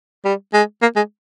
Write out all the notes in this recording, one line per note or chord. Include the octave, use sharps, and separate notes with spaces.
G3
G#3
A#3
G#3